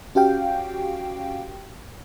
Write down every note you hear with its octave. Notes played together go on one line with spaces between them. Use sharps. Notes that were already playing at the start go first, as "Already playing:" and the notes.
C#4 F#4 G4 F5 G5